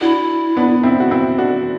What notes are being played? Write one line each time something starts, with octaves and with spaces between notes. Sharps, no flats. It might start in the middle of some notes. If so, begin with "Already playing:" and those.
D4 E4 F#4
B3 D4
C4 E4
F#4
C4 E4
D4 F#4